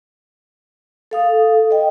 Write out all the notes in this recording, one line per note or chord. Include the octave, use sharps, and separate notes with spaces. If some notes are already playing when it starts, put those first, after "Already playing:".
A4 F5 D#6
D#5 G5